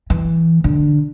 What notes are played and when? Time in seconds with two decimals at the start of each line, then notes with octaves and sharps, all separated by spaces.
0.10 E3
0.64 D3